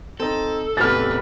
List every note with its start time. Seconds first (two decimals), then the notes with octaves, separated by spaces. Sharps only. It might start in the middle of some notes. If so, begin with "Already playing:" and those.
0.20 C4 D#4 A4
0.77 A1 E2 C3 B4 F6 A6